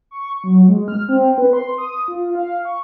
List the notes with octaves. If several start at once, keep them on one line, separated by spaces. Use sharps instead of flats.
C#6
F#3
G#3
F6
C4
B4
C6
D#6
F4
F5
C#6